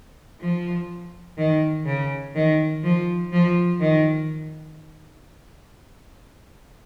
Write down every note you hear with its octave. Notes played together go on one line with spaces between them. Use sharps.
F3
D#3
C#3
D#3
F3
F3
D#3